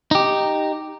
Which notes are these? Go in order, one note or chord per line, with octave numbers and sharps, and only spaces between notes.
D#4 G4